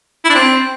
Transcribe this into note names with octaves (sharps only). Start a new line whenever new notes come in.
E4
D4
C4